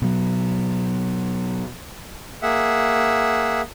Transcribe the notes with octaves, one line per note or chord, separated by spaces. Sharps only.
B2 F#3
A#3 G#4 E5 F#5